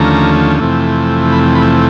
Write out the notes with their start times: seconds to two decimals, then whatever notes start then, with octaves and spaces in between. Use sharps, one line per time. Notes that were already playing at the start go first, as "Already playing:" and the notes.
Already playing: D#2 D3 F3 A3 C#4 A#5
0.60 F2 C3 E3 A3
1.32 B5
1.55 B5